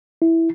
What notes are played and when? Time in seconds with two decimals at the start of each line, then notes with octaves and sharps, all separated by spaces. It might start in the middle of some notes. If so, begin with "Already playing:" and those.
0.22 E4